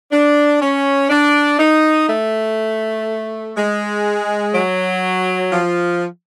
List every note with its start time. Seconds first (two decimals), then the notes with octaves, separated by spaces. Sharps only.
0.12 D4
0.62 C#4
1.10 D4
1.59 D#4
2.09 A3
3.56 G#3
4.54 F#3
5.52 F3